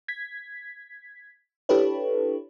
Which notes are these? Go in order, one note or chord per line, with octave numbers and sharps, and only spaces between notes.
G#6 B6
D4 E4 G4 A4 B4 C#5